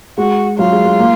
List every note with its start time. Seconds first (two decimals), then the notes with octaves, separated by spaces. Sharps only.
0.18 G#3 F#4
0.58 F#3 F4
0.73 G#3
0.85 G#3
1.00 A#3